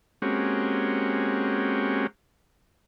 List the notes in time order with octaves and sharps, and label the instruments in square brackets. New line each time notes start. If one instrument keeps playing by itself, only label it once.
[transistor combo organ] G#3 A#3 C4 C#4 F#4 G4